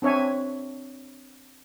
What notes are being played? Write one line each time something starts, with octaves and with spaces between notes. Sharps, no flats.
C4 D4 C#5 E5 G#5